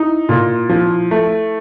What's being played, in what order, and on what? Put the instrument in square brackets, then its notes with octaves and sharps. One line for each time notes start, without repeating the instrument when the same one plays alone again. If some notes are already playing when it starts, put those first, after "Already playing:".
Already playing: [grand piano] D#4 [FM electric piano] E4
[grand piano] A#2
F3
A3